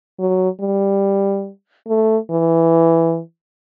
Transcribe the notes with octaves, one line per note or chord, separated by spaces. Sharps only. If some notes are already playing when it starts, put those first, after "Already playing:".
F#3
G3
A3
E3